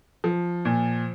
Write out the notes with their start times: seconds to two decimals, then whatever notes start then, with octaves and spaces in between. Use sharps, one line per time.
0.24 F3
0.65 A#2